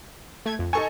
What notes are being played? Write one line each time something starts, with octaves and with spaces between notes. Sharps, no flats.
A3 G#6
F2
D#4 A4 G#5 C#6